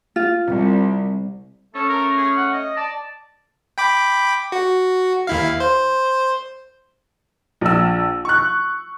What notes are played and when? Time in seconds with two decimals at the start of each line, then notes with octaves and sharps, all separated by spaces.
0.16 F4
0.48 C2
1.74 A3 C#4 A4
1.89 A#4
2.18 G#4
2.37 F#5
2.53 D#5
2.77 D5 A5
3.78 G5 B5 D6
4.52 F#4
5.27 D#2 E4 F5
5.60 C5
7.61 A#1 E6
8.25 C#6 F#6